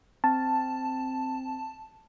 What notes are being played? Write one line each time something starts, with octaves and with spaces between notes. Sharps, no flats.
C4 A5